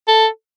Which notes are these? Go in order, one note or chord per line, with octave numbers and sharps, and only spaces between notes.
A4